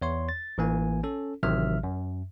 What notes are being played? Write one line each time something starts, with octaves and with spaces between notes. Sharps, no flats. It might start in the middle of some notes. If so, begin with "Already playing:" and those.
E2 C#5 C6
A6
A1 E3 A#3 G#5
C#4 A4
A1 C3 D#3 F#3 E5 F6
F#2